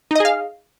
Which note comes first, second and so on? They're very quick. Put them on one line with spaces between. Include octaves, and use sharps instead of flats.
D#4 D#5 G#4 F5